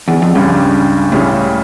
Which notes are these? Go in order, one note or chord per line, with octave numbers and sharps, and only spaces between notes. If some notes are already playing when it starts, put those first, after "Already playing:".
E2
F2
C#2 G2 C#3 G3 C#4
C#2 A2 C#3 G3 C#4